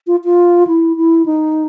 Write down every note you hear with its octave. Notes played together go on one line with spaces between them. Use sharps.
F4
F4
E4
E4
D#4